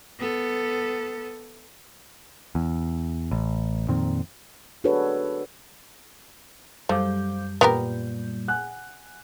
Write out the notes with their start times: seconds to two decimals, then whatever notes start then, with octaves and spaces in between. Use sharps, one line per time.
0.19 B3 A4
2.55 E2
3.31 A1
3.88 F2 A#2 D#3 C4
4.84 D4 F#4 G#4 A4 B4 C#5
6.89 F#2 G3 A3 C5 F5 D6 G6
7.61 A#2 B3 G4 A#4
8.48 F#5 G#5 F#6